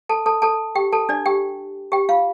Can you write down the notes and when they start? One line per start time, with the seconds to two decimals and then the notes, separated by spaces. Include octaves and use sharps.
0.09 A4 A5
0.26 A4 A5
0.42 A4 A5
0.75 G4 G5
0.93 A4 A5
1.09 D4 D5
1.26 G4 G5
1.92 G4 G5
2.09 F4 F5